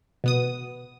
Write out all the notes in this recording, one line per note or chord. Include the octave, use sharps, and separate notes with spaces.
B2 B3 D#6